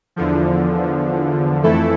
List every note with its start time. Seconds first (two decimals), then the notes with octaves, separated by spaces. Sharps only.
0.16 E2 D3 F3
1.63 F2 E3 A3 E4 A4